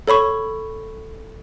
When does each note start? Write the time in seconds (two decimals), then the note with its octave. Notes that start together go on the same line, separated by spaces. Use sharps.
0.07 A4 C#5 B5 C#6